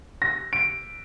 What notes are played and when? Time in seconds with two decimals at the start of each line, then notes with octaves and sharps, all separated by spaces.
0.22 A#6
0.53 D7